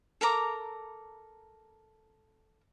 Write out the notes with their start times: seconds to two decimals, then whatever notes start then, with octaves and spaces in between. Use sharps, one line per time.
0.21 A4 A#4 A#5 D6